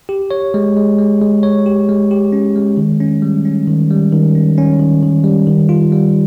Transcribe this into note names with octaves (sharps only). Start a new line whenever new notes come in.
G4
C#5
G#3
G#3
G#3
G#3
C#5
G4
G#3
G4
C#4
G#3
D#3
C#4
G3
C#4
D#3
G3
D#3
C#4
C#4
D#3
D#3
G3
D#3
F4
G3